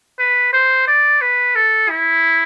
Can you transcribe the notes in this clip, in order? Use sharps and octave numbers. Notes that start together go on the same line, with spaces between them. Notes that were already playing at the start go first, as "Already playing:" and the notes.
B4
C5
D5
B4
A4
E4